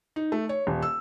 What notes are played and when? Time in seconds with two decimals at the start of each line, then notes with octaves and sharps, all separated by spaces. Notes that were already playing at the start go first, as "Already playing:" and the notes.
0.16 D#4
0.32 A3
0.49 C#5
0.67 D#1
0.82 E6